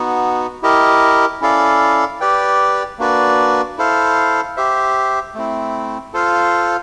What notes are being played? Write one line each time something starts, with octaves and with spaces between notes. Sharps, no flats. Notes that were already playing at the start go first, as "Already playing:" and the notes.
Already playing: B3 D#4 F#4
E4 G4 A#4 D#5
C#4 E4 A4 D5 F5
G4 B4 D5 G5
A#3 D4 F#4 B4 D5
E4 A4 C5 F5
G4 C5 E5
A3 C4 E4
F4 A4 C5 F5